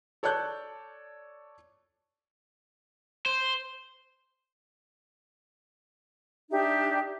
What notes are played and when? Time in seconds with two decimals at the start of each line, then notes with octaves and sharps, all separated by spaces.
0.23 A4 C#5 D5 A5 F#6 G6
3.26 C5
6.50 D4 D#4 G4 E5